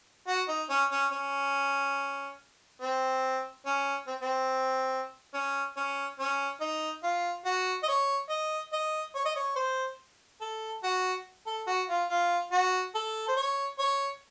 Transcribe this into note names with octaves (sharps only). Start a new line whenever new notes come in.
F#4
D#4
C#4
C#4
C#4
C4
C#4
C4
C4
C#4
C#4
C#4
D#4
F4
F#4
D#5
C#5
D#5
D#5
C#5
D#5
C#5
C5
A4
F#4
A4
F#4
F4
F4
F#4
A4
C5
C#5
C#5